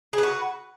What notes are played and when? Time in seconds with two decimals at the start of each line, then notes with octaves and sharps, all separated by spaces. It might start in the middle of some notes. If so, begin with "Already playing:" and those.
0.13 G#4
0.18 B4
0.23 F#4